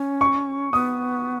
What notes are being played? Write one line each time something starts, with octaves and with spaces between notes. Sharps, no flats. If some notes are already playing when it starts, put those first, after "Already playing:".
Already playing: C#4
C#6
B3 D#6